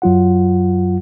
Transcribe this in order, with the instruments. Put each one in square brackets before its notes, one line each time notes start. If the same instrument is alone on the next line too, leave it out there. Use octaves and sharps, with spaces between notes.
[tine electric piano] F#2 F#3 F4 F#5